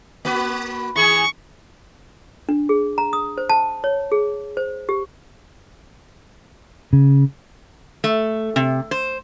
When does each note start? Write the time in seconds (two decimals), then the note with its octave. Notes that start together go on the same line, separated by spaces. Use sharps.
0.25 A#3 F#4 B4
0.96 E3 G#4 C#6
2.49 D4
2.69 G#4
2.98 A#5
3.13 D#6
3.38 C5
3.50 A5
3.84 C#5
4.12 G#4
4.57 C5
4.89 G4
6.93 C#3
8.04 A3
8.56 C3
8.91 C5